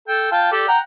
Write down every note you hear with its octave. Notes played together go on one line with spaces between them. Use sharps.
A4 G5
F4 G5 A5
G4 A4 D5
F#5 G5 A#5